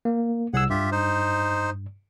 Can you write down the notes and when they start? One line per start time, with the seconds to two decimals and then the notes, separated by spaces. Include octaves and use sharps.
0.05 A#3
0.54 C2 G#4 F#5 E6
0.70 G2 F4 G4 E5
0.92 D#4 C5